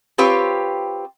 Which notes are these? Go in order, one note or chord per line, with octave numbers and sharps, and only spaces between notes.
C4 F4 G4 B4 C#5